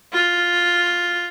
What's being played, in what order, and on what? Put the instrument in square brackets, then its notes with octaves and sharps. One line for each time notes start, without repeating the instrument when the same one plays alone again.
[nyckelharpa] F4